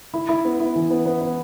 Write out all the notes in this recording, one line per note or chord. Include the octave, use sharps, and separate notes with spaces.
E4
E4
B3
E4
E3
B3
B3
B3